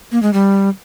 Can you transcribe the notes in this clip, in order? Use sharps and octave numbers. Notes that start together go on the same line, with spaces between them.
A#3
G#3
G3